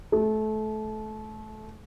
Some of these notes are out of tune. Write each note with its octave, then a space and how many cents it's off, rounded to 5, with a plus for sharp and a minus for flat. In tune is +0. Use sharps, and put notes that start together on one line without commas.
A3 -25